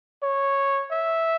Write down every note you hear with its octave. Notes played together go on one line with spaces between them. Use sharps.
C#5
E5